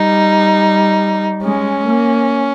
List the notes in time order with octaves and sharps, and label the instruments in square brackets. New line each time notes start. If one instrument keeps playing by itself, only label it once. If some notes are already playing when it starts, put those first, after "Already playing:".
Already playing: [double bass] G3 [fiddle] D#4
[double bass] G#3 [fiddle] C#4
[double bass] A#3